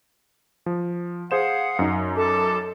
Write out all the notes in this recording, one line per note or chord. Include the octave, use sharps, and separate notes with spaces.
F3
G#4 C5 F5 F#5 D#6 E7
F#2 D#4
A4 A5 D6